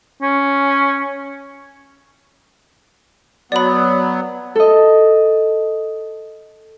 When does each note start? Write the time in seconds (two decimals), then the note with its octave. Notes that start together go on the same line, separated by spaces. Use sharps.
0.21 C#4
3.52 F#3 B3 D5 B5
4.55 A4 D#5